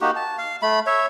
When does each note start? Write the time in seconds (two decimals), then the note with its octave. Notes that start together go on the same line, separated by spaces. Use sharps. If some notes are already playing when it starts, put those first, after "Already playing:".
0.01 A#3 D#4 F#4 G4
0.16 A5
0.38 F5
0.62 A3 B5
0.87 C#5 E5